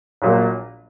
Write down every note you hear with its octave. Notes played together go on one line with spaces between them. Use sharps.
A#1 A#2 F#3 A#3